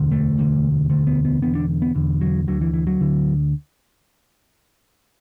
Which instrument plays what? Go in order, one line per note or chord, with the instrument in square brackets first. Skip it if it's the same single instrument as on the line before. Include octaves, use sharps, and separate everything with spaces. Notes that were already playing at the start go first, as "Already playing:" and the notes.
Already playing: [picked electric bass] E1 D2 D3
A3
E1 D2 D3
E1 D2 D3 A3
B3
B3
E1 E2 D3 B3
D4
B3
E1 E2 D3
F#3
D2 D3 F#3
E3
E3
F#3
D2 D3